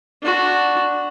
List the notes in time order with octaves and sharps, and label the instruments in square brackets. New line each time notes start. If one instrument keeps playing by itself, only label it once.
[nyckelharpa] D4 F#4